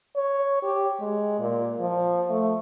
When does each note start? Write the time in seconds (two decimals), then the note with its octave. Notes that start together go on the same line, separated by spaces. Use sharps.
0.15 C#5
0.63 G4
1.00 G#3
1.39 A#2
1.80 F3
2.29 A3